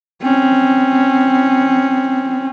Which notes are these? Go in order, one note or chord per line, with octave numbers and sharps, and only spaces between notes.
C4 C#4